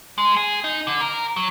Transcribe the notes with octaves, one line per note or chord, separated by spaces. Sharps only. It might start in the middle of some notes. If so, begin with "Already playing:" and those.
G#3
G#4
D#4
D3
A#4
F#3